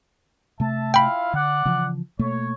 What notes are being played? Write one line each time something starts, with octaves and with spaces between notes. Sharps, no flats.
C3 A3 E5 A5
E4 F4 F5 G5 B5
D3 D5 F#5
C#3 E3 F3
B2 A3 A#3 C#5